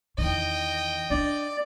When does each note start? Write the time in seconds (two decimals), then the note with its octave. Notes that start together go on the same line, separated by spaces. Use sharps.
0.18 E2 D#3 D#5 G5
1.10 D4 D5